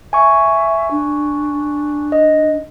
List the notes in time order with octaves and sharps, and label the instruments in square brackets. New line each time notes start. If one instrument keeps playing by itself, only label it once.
[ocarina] E5 [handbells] G#5 C#6
[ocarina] D4
[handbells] D#5